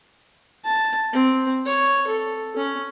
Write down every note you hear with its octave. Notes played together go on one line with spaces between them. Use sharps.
A5
C4
C#5
A4
C#4